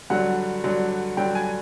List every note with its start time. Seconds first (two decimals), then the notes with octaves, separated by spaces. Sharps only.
0.10 G2 D3 F#3 F#5
0.64 G2 D3 F#3
1.17 G2 D3 F#3 G5
1.35 G#5